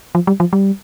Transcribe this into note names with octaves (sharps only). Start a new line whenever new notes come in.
F3
G3
F3
G3